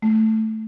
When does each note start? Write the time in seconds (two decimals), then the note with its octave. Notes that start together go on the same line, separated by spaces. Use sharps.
0.02 A3